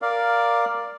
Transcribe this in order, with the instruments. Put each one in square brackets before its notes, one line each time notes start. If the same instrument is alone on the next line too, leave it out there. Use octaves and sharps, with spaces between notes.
[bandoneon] A#4 D5 F5